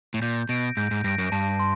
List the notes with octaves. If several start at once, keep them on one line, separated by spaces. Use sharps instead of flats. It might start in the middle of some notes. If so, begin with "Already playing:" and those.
A2
A#2 G6
B2 A#6 D7
G#2 G6
G#2
G2 A#6 D7
F#2
G2 A5
C6